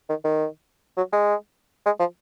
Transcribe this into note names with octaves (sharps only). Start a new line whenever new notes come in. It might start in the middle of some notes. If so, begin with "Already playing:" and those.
D#3
D#3
F#3
G#3
G#3
F3